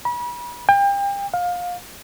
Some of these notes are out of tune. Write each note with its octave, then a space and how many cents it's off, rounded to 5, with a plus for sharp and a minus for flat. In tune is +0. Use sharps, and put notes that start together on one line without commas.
B5 -35
G5 +35
F5 +25